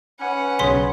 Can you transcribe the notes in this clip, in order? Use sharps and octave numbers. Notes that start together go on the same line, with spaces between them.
C#4 B4 F#5
B1 C#3 C#5 C6 B6